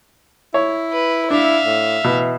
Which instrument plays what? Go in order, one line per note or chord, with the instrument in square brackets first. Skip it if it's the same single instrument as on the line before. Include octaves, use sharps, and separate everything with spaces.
[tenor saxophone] E4 [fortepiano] C#5
[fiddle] B4
[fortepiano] D4 [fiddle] E5 F5
[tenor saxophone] A2
[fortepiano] B2 [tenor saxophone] E3